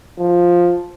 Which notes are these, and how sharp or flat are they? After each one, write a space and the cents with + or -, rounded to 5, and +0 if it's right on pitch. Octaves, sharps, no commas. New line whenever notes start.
F3 +5